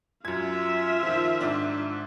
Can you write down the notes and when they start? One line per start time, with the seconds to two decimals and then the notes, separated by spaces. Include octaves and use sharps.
0.25 F#2 F4 E5 G#6
1.03 D#3 F3
1.41 G#2 D4